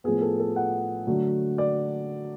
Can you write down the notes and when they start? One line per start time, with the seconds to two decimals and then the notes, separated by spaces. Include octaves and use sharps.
0.04 A2 F3 B3 G#4
0.22 A4
0.39 A4
0.56 F#5
1.07 D3 F#3 A3
1.58 D5